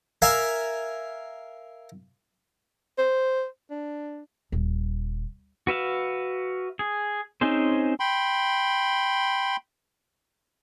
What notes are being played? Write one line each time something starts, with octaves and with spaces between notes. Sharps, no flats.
A#4 E5 F5 G#5
C5
D4
D#1
F#4 B4 E5 F5
G#4
C4 C#4 D#4 G#4 C5
G5 B5 C6